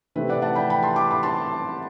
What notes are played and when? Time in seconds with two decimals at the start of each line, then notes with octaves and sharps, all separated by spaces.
0.15 C3 E3 A3 C4 E4 B4
0.30 D5 F#5
0.42 F#5 A5
0.55 G5 B5
0.70 G5 B5
0.83 A5 C6
0.96 B5 D6
1.11 B5 D6
1.23 A5 C6